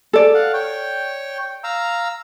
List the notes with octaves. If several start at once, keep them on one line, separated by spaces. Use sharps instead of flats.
A4 D5
F5 F#5
C#5 G5
F5 A#5 E6